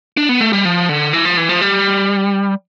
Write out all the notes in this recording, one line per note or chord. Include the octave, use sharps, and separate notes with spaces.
D4
B3
A3
G3
F3
D3
E3
F3
E3
F3
G3